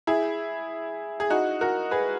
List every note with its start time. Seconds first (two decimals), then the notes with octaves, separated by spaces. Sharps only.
0.07 E4 G#4
1.20 G#4
1.30 D#4 F#4
1.61 F#4 A#4
1.91 G#4 B4